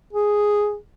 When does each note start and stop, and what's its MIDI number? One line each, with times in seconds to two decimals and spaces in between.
0.13 0.75 68